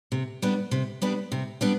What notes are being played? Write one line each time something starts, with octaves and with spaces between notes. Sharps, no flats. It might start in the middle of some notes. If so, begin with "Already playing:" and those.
C3
G3 B3 D4
C3
G3 B3 D4
C3
G3 B3 D4